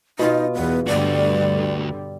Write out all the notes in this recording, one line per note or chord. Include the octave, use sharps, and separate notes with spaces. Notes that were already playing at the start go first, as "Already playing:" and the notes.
B2 D#4 F4
E2 B3
D2 G2 D3 G3 F#4 D5